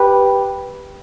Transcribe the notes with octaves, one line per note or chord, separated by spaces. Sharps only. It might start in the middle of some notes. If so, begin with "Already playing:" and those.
Already playing: G4 B4